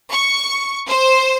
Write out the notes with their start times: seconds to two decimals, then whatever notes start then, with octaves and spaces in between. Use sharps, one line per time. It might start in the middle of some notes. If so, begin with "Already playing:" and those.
0.10 C#6
0.87 C5